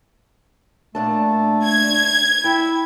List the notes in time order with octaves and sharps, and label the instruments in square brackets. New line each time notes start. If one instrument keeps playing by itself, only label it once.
[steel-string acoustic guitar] A#2 D4 A5 [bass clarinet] A3
[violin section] G#6
[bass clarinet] E4 [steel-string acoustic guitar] G5